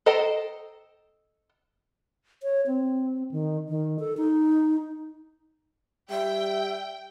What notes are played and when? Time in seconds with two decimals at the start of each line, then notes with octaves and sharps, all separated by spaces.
0.06 A4 C5 D#5 G5 A#5
2.43 C#5
2.67 C4
3.31 D#3
3.69 D#3
3.99 A4
4.17 D#4
6.10 G3 E5 G5